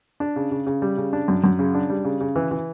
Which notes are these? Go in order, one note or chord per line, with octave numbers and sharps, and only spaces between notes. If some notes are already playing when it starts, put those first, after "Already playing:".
D4
C#3
C#3
C#3
G3
C#3
D4
F#2
F#2
C#3
D4
G3
C#3
C#3
E3
E3